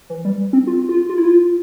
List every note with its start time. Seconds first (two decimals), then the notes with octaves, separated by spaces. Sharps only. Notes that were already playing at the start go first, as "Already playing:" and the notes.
0.10 E3
0.25 G3
0.53 C4
0.67 F4
0.89 F4
1.09 F4
1.18 E4
1.25 F4